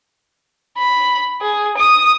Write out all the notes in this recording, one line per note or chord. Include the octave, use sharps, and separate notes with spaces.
B5
G#4
D#6